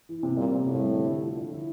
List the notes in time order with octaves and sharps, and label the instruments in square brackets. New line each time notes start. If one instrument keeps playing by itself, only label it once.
[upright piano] E3
C3
[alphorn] A#2 [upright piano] G3
[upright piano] C4
[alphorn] A2 [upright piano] C3
[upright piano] G3
D3
E4
F3
D3
E4